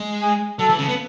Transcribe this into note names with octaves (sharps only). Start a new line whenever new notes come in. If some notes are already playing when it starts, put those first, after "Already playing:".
Already playing: G#3
G#4
F#3 A4
E3
C#3
B3